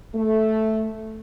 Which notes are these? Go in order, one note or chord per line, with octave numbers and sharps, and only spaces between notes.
A3